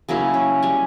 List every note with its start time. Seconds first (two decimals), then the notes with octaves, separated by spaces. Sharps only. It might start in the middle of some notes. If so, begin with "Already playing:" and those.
0.09 C#3 F#3 A#3 E4
0.34 C#4
0.63 G3 C#4 G#5